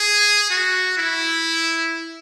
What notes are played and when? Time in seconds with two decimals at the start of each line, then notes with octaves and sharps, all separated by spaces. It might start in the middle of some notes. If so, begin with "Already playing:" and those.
Already playing: G#4
0.50 F#4
0.98 E4